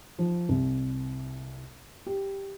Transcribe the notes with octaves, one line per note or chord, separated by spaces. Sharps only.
F3
C2
G4